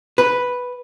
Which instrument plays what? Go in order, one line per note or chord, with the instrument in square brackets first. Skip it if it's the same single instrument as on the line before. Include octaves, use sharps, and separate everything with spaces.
[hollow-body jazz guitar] B4